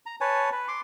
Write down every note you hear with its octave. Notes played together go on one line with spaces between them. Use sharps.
A#5
B4 C#5 G#5 A5
B4
C6 D6